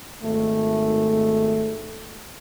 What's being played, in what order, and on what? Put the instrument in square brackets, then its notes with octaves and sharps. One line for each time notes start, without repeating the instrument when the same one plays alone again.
[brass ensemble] G#1 A3